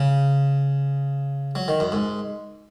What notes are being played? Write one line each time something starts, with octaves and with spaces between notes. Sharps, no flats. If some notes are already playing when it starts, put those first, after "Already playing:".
Already playing: C#3
F#3
D#3
F#2
G#2